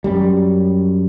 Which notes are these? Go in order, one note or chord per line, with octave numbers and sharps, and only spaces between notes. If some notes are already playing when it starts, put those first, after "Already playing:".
F#2 G3